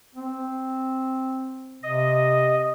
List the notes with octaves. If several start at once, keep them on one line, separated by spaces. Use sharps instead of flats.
C4
C3 D#5